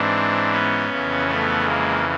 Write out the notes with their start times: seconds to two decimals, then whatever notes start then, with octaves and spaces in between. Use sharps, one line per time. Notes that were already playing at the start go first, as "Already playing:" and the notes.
Already playing: G#2 E3 C4 D4
0.51 B3 C#4
0.89 F2 C#3 E3
1.27 A3 B3
1.64 G#3 A#3